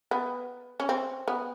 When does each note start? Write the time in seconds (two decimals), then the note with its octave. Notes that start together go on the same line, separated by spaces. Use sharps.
0.11 B3
0.80 C#4
0.89 C4
1.28 B3